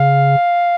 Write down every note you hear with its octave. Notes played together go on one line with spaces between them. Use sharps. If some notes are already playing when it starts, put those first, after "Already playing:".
Already playing: C#3 F5